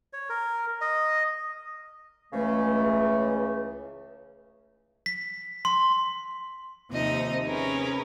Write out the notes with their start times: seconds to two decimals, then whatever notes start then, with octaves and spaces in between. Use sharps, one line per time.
0.13 C#5
0.29 A#4
0.81 D#5
2.33 C#2 C#3 E3 A3
5.06 B6
5.65 C6
6.90 D#2 C3 F3 D#4 D#5
7.46 C3 C#4 G#4 A#4 B4